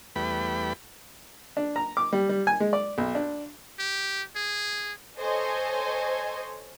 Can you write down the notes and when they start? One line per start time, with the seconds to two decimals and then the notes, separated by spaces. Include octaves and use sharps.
0.16 E2 G3 A3 B4 G5 B5
1.57 D4
1.76 A#5
1.97 D6
2.13 G3
2.29 G3
2.47 G#5
2.60 G#3
2.73 D5
2.98 B1
3.15 D4
3.79 G4
4.36 G#4
5.18 A4 C5 C#5 D#5 G#5